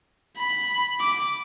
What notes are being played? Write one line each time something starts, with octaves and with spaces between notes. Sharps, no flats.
B5
D6